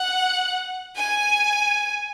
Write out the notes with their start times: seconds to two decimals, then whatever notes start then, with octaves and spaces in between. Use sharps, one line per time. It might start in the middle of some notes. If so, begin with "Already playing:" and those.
Already playing: F#5
0.96 G#5